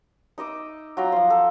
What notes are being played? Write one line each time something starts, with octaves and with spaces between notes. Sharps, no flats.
D#4 D#5 D6 E6
F#3 F4 G5 A#5
F3 C5
A4